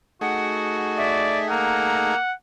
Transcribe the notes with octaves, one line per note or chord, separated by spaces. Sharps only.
A3 D#4 F#4 G#4 F#5
D5 E5
A#3 F#5 A#5